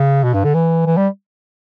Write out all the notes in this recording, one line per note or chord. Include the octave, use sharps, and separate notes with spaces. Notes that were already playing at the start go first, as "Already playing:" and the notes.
Already playing: C#3
B2
G2
D3
E3
E3
G3